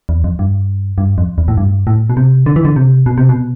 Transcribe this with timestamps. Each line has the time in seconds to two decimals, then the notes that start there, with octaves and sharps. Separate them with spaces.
0.09 E2
0.24 F2
0.39 G2
0.98 G2
1.18 F2
1.38 E2
1.48 A2
1.57 G2
1.87 A2
2.10 B2
2.17 C3
2.46 D3
2.56 E3
2.65 D3
2.76 C3
3.06 B2
3.18 C3
3.29 B2